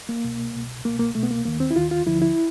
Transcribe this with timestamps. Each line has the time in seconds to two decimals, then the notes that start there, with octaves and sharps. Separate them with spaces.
0.09 A#3
0.24 C2 B2
0.55 C2 B2
0.85 C2 B2 A#3
0.99 A#3
1.15 C2 B2 A3
1.23 B3
1.31 A#3
1.45 D#2 D#3 A#3
1.60 C4
1.71 E4
1.75 D#2 D#3 F4
1.91 F4
2.06 D2 D3 F3 E4
2.22 E4